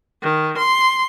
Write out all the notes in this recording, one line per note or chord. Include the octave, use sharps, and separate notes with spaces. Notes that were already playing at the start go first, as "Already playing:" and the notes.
D#3
C6